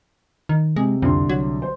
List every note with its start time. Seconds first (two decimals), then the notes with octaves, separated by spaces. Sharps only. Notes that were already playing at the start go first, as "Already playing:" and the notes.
0.49 D#3
0.76 C3 G#3
1.02 C2 F2 D3 C6
1.29 F#3
1.62 C5